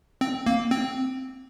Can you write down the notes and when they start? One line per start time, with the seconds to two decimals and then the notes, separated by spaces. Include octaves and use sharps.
0.21 C4
0.46 A#3
0.71 C4